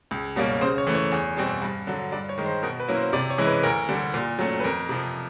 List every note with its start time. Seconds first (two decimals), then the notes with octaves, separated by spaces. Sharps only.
0.11 C#2
0.36 B2 G3 A#3 C#4
0.61 C#3 C5
0.78 C#5
0.87 E3 A3
0.94 C#5
1.12 E2
1.37 B2 G3 C4
1.62 G2
1.87 D3 F#3
2.12 G2 D5
2.29 C#5
2.38 D#3 G#3
2.46 C5
2.63 B2 A#4
2.80 B4
2.88 F#3 A#3 C#4 E4
2.96 C5
3.13 C3 D5
3.30 C#5
3.38 E3 G#3 C#4 E4
3.47 B4
3.63 D2 A#4
3.89 D3 G3
4.14 A#2
4.39 F#3 A3 C#4
4.60 B4
4.64 F2 A#4
4.89 C3 F3